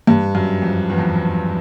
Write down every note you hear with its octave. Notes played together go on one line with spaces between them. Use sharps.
G2
F#2
F2
E2
F2
E2